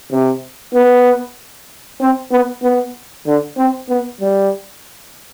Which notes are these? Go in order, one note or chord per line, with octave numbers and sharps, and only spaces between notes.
C3
B3
C4
B3
B3
D3
C4
B3
G3